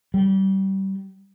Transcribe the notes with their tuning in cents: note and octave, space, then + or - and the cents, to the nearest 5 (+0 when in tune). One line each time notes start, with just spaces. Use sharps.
G3 -25